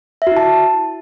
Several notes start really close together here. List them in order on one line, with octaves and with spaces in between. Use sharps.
E5 F#4 E4 A5